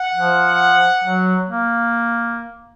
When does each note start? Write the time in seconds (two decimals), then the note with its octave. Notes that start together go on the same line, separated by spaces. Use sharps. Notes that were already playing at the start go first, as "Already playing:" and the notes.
Already playing: F#5
0.15 F3
1.04 F#3
1.49 A#3